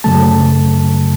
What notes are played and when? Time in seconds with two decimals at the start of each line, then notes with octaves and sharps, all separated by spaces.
0.04 F#2 C#3 F#3 A3 A5